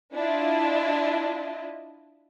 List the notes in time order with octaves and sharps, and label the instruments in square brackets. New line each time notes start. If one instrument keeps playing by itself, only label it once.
[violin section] D4 E4 F4 D#5